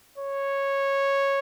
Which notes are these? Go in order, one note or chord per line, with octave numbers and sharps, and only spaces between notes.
C#5